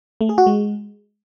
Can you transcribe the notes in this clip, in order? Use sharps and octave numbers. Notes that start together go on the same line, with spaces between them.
A3
G#4
F#4
G#3